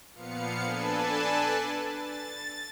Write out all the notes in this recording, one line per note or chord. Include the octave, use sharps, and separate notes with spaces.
A#2 F3 B3 F5 C#7
D4 A4 B4 G#5 A5
A6